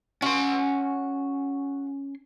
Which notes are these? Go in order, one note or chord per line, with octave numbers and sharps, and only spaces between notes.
C#4 F#4 C6